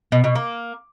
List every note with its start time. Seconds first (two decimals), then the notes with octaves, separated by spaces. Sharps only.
0.12 B2
0.24 B2
0.35 A#3